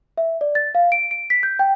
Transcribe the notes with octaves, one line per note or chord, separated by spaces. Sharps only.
E5
D5
A6
F5
D7
D7
B6
G6
G5